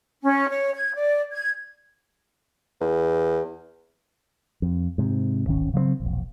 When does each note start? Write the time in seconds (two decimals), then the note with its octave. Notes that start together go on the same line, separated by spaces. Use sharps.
0.23 C#4
0.48 C#5
0.75 G#6
0.95 D5
1.31 G#6
2.81 E2
4.62 F2
4.98 G#2 C3
5.46 D1 G#1 D#3 C#4
5.74 C#3 F#3 A3 C4
6.00 E1 A#1